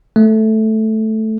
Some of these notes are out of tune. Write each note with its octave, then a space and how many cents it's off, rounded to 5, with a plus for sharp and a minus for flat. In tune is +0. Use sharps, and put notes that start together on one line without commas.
A3 -5